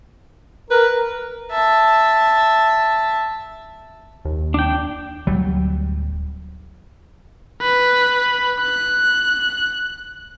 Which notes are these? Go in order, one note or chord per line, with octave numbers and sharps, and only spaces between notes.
A#4 B4
E5 A5
D#2
D4 G5
D1 F#3 G3
B4
F#6